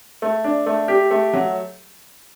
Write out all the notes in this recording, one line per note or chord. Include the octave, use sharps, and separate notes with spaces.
A3
D4
A3
G4
A3
F#3